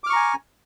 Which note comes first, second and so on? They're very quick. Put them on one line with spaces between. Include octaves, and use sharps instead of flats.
D6 F6 C#6 A#5 G#5